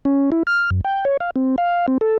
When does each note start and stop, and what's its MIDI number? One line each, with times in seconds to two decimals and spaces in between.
0.05 0.30 61
0.32 0.43 64
0.47 0.70 89
0.71 0.81 42
0.85 1.05 79
1.05 1.17 73
1.20 1.31 77
1.36 1.56 60
1.58 1.86 77
1.88 1.98 60
2.01 2.18 69